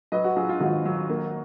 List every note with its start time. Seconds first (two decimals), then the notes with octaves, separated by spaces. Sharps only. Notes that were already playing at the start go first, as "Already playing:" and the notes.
0.12 F#3 B4 D#5
0.24 F#4
0.36 F#3 F4 G#4
0.49 F4
0.61 G#1 F#4
0.85 F#3
1.10 A#3